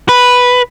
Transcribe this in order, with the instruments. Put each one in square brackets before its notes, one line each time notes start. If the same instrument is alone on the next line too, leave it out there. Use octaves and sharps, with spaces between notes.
[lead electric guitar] B4